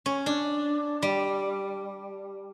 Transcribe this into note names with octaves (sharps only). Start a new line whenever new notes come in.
C#4
D4
G3